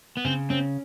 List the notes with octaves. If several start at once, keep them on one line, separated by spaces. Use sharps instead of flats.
B3
C#3 C4
C4 C#4